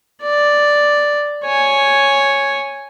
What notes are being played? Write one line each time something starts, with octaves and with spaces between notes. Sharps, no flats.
D5
C#5 G#5